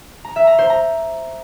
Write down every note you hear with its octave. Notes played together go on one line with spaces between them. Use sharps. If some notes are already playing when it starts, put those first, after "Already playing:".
A#5
E5
A#5
C5
A#5